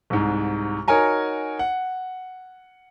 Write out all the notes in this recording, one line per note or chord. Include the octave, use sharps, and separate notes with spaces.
C2 G#2
D#4 F#4 A#4 C#5 G#5 A#5
F#5